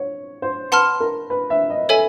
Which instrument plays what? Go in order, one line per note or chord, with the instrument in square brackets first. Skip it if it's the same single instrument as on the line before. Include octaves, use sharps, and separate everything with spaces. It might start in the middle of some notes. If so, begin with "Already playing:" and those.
Already playing: [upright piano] C#5
C5
[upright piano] B4 [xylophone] F#5 A5 C6 F6
[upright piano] A#4
B4
E5
D#5
[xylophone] A4 C#5 E5 G#5